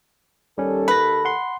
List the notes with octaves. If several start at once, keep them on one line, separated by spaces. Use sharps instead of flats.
D#2 G3 C#4 A4
B4 B5 A#6
F#5 C6